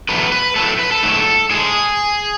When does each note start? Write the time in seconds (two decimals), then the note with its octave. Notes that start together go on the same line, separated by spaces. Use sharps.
0.09 E2 B2 F#3 A3 B4
0.32 B4
0.56 A2 F#3 A3 A4
0.79 B4
0.92 A4
1.03 G#2 F#3 A3
1.50 A2 G#3 G#4